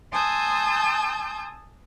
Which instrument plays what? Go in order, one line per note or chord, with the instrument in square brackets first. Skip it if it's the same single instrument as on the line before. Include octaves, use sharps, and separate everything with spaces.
[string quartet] G#5 A5 C6 D#6 E6 G6